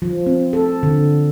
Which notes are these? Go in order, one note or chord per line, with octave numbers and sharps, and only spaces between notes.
F3
C4
A4
D3